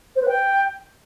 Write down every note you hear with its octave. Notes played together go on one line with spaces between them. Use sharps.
C5
B4
G5